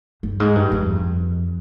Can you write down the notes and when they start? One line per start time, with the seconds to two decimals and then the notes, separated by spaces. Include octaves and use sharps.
0.23 G2
0.40 G#2
0.55 G2
0.72 F2